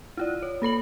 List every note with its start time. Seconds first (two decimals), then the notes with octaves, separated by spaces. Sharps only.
0.17 E4 F4 D5
0.43 C#5
0.62 A#3 A4 B5 F#7